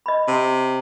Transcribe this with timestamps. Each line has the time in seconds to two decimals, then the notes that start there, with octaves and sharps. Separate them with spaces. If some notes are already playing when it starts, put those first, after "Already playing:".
0.06 D#5 B5
0.28 C3